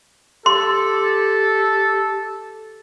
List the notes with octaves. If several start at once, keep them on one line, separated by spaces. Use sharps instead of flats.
G4 A4 C6